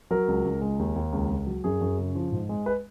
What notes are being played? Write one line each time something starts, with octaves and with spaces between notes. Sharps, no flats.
F#3 A#4
C#2
C#2
G#3
D#2
D#2
C#2
C#2
F#3
F#2 G#4
F#2
C#3
F3
G#2
G#3
B4